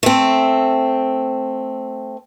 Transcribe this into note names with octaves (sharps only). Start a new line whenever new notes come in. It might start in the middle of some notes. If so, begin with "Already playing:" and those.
A3 C4